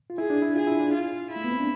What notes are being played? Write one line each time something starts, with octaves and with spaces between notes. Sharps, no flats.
F4
E4 G#4
D4
E4
F4 G#4
E4
D4
F4
E4
A3
B3
C4
D4